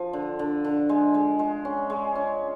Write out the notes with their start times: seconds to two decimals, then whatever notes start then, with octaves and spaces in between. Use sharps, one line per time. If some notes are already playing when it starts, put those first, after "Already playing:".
Already playing: F3
0.13 D3
0.39 D3
0.64 D3
0.89 G#3
1.14 G#3
1.39 G#3
1.65 C#4
1.90 G#3
2.15 C#4